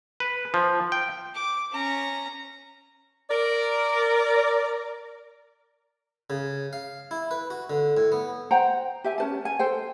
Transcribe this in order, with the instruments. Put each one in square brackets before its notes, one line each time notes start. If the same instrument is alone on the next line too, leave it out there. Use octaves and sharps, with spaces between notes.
[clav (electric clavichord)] B4
F3
G5
[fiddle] D6
C#4 A#5
[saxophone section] A#4 D5
[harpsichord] C#3
F5
E4
B4
F#4
D3
A2
B3
[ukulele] C5 F#5 G5 A#5
G4 E5 G#5
C#4 B4 A5
G#5
A4 C5 G5